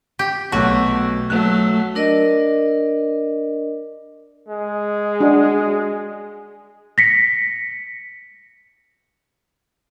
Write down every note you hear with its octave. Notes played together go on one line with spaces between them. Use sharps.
G4
B1 B2 A3 F#4
F#3 A3 F#6
D4 A#4 D5 D#5
G#3
D4 F#4
A#6 B6 C#7